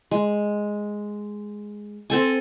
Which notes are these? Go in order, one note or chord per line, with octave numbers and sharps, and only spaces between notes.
G#3
C4 A4 G#5